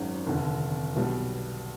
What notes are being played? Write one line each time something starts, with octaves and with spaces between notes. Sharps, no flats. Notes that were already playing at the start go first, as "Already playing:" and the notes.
Already playing: G#1 F#2 D#3 G#3 C4
F1 D#2 D3
B1 B2 G3